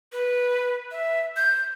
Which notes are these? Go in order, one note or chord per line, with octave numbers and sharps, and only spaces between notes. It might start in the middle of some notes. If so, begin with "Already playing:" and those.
B4
E5
G6